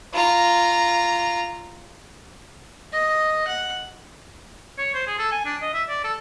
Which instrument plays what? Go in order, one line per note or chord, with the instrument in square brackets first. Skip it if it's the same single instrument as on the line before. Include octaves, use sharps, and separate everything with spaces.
[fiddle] F4 A#5
[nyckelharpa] D#5
F#5
[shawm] C#5
C5
G#4
A4
G#5
D4
D#5
E5
D5
A4